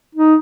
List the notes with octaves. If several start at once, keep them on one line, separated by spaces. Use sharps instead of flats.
D#4